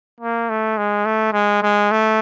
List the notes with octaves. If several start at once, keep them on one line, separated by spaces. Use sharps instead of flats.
A#3
A3
G#3
A3
G#3
G#3
A3